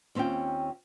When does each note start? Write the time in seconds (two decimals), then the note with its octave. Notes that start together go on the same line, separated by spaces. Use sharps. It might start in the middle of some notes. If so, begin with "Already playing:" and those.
0.15 D#2 C4 C#4 F4 G5